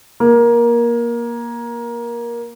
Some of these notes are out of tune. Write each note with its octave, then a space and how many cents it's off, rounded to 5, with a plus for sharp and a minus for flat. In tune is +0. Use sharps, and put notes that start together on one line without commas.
A#3 +20